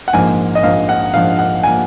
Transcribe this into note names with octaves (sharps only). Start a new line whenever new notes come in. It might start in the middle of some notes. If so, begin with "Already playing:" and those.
F#5
A#1 G#2 F3 A#3 G#5
D#5
A#1 G#2 F3 A#3 F5
F#5
A#1 G#2 F3 A#3 F5
F#5
F3 A#3 G#5